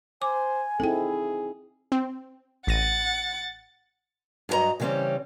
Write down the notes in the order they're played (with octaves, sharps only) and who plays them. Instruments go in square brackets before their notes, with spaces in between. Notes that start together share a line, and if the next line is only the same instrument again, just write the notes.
[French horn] C5 [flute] G#5 [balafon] D6
[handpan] C4 D#4 E4 [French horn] G#4 [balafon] A4 G5
[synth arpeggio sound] C4
[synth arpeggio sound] A1 A#6 D#7 [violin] F#5 A6
[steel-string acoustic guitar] G2 F#3 G4 D#5 A#5
C#3 E3 G3 C4 C#4